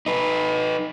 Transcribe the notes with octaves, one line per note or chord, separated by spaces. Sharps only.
D#4 B4